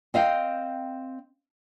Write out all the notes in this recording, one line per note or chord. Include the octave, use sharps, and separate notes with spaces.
C4 D#5 F5 G5